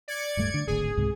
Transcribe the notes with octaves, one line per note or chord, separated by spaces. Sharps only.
D5 G#6 C#7
D1 G2 A3
D3
D1 G#1 D2 G#4
C#2 G#2 C3